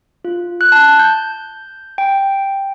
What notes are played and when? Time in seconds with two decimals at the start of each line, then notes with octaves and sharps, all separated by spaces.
0.25 F4
0.61 F#6
0.72 A5
0.99 G6
1.98 G5